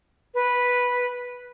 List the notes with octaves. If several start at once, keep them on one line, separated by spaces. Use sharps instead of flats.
B4